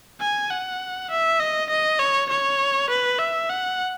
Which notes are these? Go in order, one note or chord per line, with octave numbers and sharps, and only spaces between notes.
G#5
F#5
E5
D#5
D#5
C#5
C#5
B4
E5
F#5